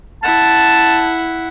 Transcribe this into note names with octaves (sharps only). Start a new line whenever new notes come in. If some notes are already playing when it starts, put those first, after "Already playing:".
E4 F#5 A5